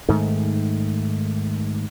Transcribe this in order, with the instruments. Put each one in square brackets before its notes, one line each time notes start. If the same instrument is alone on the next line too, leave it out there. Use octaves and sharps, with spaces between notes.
[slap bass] G#2 D#3 A3